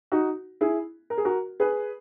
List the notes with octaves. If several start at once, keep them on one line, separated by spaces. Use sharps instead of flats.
D#4 F#4
E4 G#4
A#4
G#4
F#4 A#4
G#4 B4